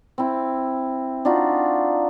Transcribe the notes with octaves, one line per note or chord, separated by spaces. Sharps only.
C4 E4
D4 D#4 F4 F#4